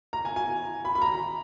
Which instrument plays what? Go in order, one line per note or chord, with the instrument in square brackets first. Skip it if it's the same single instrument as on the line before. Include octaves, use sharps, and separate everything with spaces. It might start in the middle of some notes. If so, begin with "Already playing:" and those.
[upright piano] A#5
G#5
G#5
B5
B5
A#5